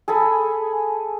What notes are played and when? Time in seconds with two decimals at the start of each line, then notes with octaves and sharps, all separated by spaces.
0.08 G#4 A4 G#5 B5